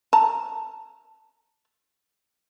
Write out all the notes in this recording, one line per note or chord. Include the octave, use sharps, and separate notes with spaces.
A5 A#5